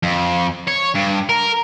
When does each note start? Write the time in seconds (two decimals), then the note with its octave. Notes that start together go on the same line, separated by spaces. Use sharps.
0.03 F2
0.67 C#5
0.95 G2
1.29 A#4